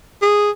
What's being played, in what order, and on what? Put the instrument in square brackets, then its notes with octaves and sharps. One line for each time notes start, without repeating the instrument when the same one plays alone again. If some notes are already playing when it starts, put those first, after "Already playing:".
[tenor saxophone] G#4